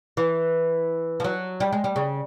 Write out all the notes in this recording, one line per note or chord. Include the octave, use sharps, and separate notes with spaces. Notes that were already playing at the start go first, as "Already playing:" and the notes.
E3
F3
F#3
G3
G#3
G3
C#3